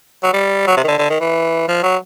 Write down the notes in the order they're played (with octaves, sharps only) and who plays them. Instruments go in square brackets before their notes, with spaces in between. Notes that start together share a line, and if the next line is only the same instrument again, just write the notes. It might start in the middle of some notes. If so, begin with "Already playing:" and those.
[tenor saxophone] F#3
G3
F#3
C3
D#3
D3
D3
D#3
E3
F3
F#3